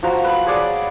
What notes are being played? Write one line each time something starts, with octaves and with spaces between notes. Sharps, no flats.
F3 F#4 A#5
B4 B5
G#4 C#5 D5 F#5